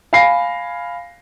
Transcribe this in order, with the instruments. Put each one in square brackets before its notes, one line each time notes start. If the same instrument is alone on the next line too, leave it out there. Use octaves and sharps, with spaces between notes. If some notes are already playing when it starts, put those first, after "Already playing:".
[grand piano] F5 G#5 B5 A#6 C7